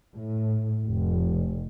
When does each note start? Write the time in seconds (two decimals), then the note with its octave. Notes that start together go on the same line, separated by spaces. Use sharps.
0.14 A2
0.84 F1